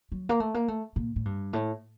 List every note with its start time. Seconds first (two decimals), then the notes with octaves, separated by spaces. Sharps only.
0.12 F#3
0.29 A#3
0.40 A3
0.54 A#3
0.68 A3
0.96 A#2
1.16 A2
1.25 G2
1.53 A2